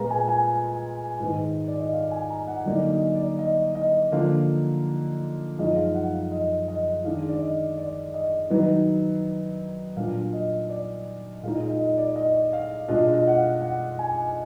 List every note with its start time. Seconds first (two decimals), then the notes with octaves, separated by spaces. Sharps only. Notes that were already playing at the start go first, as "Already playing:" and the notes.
Already playing: A#2 G#3 B3 F4 A#5
0.11 G#5
0.28 G#5
1.19 G#2 D#3 G#3 B3
1.68 D5
1.80 D#5
1.93 F5
2.11 G#5
2.30 A#5
2.47 F#5
2.66 D3 F#3 A#3 D#4 D5
2.90 D#5
3.15 D5
3.39 D#5
3.75 D#5
4.12 D3 F3 A#3 F5
5.59 F#2 F3 G#3 D#4 D#5
5.76 F5
5.95 F#5
6.13 F5
6.32 D#5
6.68 D#5
7.04 D#3 G#3 D4 F5
7.29 D5
7.41 D#5
7.78 D5
8.14 D#5
8.50 D#3 F#3 B3 D#4
9.96 A#2 F#3 D4 F5
10.33 D#5
10.70 D5
11.43 A#2 G#3 D#4 F5
11.61 D#5
11.79 D#5
11.98 D5
12.16 D#5
12.53 F5
12.88 B2 G#3 D4 F4 D#5
13.13 D#5
13.28 F#5
13.37 F5
13.62 F#5
13.99 G#5